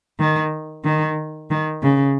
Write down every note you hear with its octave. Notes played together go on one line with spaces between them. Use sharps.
D#3
D#3
D#3
C#3